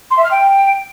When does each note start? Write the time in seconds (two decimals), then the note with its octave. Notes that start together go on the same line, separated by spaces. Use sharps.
0.11 C6
0.17 E5
0.24 F6
0.31 G5